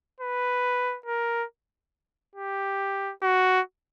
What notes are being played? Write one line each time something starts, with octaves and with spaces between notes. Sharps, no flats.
B4
A#4
G4
F#4